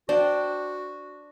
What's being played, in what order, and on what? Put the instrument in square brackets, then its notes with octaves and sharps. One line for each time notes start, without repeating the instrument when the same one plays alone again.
[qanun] D4 C5 [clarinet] F#4 [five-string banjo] D5 G5